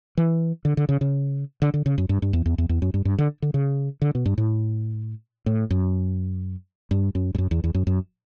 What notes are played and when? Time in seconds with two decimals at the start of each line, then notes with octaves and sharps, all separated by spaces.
0.17 E3
0.65 D3
0.77 D3
0.89 C#3
1.01 C#3
1.62 D3
1.74 D3
1.86 C#3
1.98 F#2
2.09 G2
2.22 G2
2.33 E2
2.46 E2
2.58 E2
2.69 E2
2.82 F#2
2.94 G2
3.05 G2
3.18 D3
3.42 D3
3.54 C#3
4.02 D3
4.15 B2
4.26 G2
4.38 A2
5.46 A2
5.70 F#2
6.91 G2
7.15 F#2
7.35 G2
7.38 F#2
7.51 E2
7.64 E2
7.74 F#2
7.87 F#2